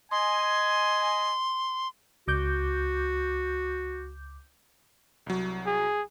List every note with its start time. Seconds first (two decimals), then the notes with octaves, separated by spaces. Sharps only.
0.11 D#5 G#5 C6
2.28 C#2 F#4 D6 G6
5.26 C2 F#3
5.67 G#4